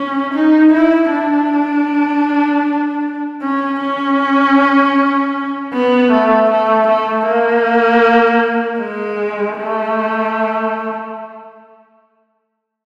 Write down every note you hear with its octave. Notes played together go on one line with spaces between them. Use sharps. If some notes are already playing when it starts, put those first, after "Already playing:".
Already playing: C#4
D#4
E4
D4
C#4
C#4
B3
A3
A3
A3
A#3
G#3
A3